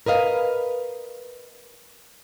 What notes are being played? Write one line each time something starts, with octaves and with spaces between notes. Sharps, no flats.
A#4 B4 D#5 F5